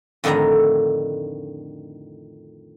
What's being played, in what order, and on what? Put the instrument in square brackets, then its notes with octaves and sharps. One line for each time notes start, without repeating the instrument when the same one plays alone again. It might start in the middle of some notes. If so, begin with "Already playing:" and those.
[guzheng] F2 A2 D3 D#3 D5 A#5